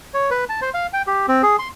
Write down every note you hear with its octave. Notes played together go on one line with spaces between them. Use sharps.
C#5
B4
A5
C5
F5
G5
G4
C4
G#4
C6